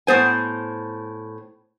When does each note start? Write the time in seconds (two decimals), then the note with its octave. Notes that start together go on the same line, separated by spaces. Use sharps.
0.07 A2 B3 C5 G#5